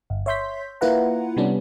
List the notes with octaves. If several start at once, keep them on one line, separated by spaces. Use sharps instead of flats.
G1
C#5 E5 C6 G6 B6
A#3 E4 F4 B4 F#5 A#5
C3 G3 B3 C#4 D4